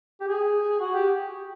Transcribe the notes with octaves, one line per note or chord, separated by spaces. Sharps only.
G4
G#4
F#4
G4